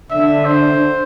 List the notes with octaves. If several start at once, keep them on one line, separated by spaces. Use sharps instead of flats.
D3 E5
C5